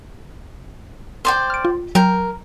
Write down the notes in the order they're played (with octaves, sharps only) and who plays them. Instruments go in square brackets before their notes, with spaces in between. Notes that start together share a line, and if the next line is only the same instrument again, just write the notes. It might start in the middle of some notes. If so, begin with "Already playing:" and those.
[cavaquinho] C5 D5 G5
[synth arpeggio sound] F6 D7
F4
[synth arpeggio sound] F#3 G5 G6 [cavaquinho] A#4